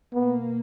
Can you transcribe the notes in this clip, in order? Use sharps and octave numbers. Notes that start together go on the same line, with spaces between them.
B2 A#3 B3